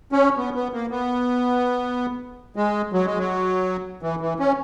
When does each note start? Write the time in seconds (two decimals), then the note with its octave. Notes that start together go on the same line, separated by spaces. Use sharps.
0.12 C#4
0.37 B3
0.55 B3
0.73 A#3
0.91 B3
2.56 G#3
2.93 F#3
3.06 G#3
3.18 F#3
4.03 E3
4.21 E3
4.39 C#4